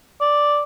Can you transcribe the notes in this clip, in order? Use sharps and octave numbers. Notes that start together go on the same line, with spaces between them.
D5